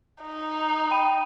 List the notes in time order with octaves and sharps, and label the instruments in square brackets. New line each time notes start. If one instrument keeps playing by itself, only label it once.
[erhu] D#4
[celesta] G5 B5 D#7